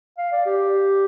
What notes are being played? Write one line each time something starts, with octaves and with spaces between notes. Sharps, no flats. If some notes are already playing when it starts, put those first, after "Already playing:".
F5
D5
G4